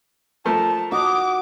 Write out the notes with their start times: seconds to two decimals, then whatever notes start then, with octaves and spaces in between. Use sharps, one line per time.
0.45 F3 A3 A#4 A5 A#5
0.92 F#4 D6 D#6